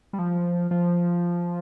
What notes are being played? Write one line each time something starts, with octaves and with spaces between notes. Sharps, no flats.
G3
F3
F3